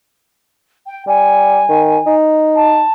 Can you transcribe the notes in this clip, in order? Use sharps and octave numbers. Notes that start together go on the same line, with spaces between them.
G5
G3 G#5
D#3
D#4
A5